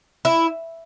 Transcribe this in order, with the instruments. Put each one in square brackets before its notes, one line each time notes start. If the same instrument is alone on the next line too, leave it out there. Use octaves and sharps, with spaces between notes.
[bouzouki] E4